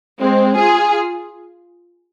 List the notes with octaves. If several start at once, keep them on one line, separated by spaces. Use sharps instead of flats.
G#3 C4
F4 G#4